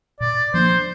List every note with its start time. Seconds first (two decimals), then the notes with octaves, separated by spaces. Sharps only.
0.20 A#2 D5
0.54 F3 A#3 D4 C5